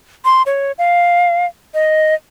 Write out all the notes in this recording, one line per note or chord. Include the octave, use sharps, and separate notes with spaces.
C6
C#5
F5
D#5